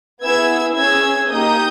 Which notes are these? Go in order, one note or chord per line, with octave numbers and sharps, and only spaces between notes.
B3 E4 G#4 E6 G#6
C#4 G#4 E6 G#6
A#3 D#4 G4 D#6 G6